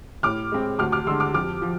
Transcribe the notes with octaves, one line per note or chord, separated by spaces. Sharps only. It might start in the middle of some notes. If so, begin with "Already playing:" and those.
A2 D6 F6
G#3 C4
D2 D6 F6
D6 F6
D3 G#3 C6 E6
D6 F6
F2 D6 F6
F3